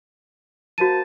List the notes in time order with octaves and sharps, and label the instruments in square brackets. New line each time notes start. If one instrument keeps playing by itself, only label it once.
[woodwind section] A#3 C5 A5 [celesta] F#4 D#7